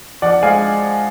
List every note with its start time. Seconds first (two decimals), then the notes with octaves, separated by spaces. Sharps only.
0.22 F3 D5 F#5
0.42 G#3 F5 G#5